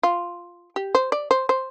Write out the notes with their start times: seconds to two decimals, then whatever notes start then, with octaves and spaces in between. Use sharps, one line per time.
0.03 F4
0.76 G4
0.95 C5
1.12 D5
1.31 C5
1.49 C5